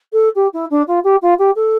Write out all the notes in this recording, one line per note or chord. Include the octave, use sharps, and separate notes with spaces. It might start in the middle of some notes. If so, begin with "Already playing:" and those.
A4
G4
E4
D4
F4
G4
F4
G4
A4